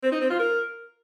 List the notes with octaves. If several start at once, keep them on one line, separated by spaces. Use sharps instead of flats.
C4
D#4
C4
F4
A#4